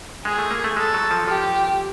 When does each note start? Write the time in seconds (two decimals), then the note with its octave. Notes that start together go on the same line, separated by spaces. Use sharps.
0.25 G#3 G#4
0.39 A3
0.51 A#3
0.64 A3
0.77 G#3 A4
0.94 F#3
1.11 F3
1.28 F3 G4